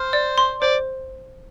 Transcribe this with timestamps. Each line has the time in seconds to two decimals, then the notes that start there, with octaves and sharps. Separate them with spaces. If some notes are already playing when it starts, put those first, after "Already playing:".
Already playing: C5 F6
0.13 D5
0.38 C6
0.62 C5 D5